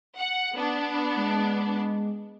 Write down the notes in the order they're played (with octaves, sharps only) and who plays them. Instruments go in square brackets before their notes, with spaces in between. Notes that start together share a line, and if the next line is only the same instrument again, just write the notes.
[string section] F#5
B3 D4
[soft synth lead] G#3